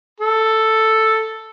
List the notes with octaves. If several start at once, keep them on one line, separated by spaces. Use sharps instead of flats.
A4